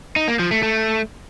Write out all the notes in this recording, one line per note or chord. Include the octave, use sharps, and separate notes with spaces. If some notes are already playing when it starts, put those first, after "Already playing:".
D#4
A#3
F3
A3
A3